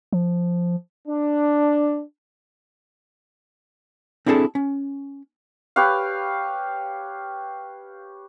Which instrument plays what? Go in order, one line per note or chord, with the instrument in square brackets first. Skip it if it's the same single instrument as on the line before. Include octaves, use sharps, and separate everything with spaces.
[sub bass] F3
[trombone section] D4
[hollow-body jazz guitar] C4 D4 E4 G#4 A4 A5
C#4
[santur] G4 B4 C#5 F5